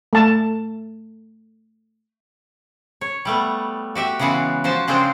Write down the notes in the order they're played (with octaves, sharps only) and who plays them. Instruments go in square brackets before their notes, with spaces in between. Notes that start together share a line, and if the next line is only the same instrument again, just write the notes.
[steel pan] A3 A5
[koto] C#5
G3 A3 B3
F#4 G4 E5 G5
C#3 E3 G#3 B3 F#4
F3 F#4 C5 A5
C#3 F3 G#3 C4 D4 C5